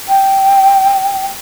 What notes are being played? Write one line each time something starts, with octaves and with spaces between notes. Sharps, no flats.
G5